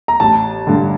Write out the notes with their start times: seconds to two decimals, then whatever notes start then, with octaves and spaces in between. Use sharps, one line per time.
0.08 A#5
0.20 A1 A5
0.67 G2 D3